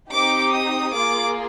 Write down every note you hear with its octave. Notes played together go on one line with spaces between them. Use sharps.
C4 D#4 G4 D6
D#6
A#3 F4 G#4 D6